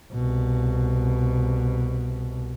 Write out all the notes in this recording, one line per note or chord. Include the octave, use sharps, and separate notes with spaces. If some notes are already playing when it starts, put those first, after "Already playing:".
C2 B2